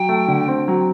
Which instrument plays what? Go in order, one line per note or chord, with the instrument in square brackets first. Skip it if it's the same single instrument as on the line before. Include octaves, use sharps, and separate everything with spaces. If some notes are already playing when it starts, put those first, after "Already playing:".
Already playing: [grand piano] F#3 [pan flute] G5
[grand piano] A3
D3
C4
F#3